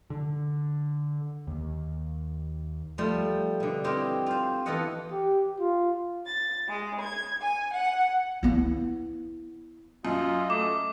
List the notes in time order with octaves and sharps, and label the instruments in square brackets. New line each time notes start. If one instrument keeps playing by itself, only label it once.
[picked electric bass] D3
D#2
[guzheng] F3 G3 A3 C6
B2 D3
C4 E4 G4 C5 D#5 F5
F4 C5
E3 B3 F4 A4 D#5 F#5
[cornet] G4
F4
[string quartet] A6
G#3
G#6
G#5
F#5
[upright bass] B3 E4
[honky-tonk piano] F#2 [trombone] F4 [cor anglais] D#5
[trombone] A3 [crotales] D6